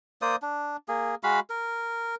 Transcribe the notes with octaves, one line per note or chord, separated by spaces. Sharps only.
A#3 C5 D5 D#6
D4
A#3 G#4
G#3 F#4 F5 B5
A#4